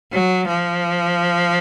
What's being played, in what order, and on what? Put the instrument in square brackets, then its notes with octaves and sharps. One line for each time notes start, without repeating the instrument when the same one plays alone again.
[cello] F#3
F3